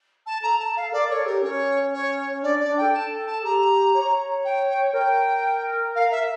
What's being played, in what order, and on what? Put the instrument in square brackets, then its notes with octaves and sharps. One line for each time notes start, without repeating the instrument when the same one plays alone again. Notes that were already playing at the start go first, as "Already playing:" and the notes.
[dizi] A5
[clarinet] A4 [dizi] A#5
[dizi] A5
F5
[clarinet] A#4 [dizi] D5
[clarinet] A4 [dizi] C#5
[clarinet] G4 [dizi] A#4
[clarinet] C#4 [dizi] C#5
[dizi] C#5
[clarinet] D4 [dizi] D5
[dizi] D5
[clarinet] D4
[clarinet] A4 [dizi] G5
[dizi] A5
A5
[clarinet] G4 [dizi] A#5
[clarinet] C#5
[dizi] G5
[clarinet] A#4 [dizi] G5
[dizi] F5
E5